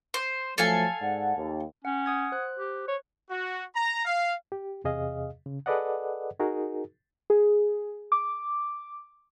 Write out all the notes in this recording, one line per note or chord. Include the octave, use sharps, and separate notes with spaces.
C5
F3 F#3 A3 A4 F5 G#5
G#2 D5 F#5
D#2
C#4 F#5
F#5 D#6 G#6
C5 F#6
G4
C#5
F#4
A#5
F5
G4
E2 C3 G#4 D#5 F5
C#3
G#4 A4 B4 D5 D#5 F#5
D#4 F#4 G#4 A#4
G#4
D6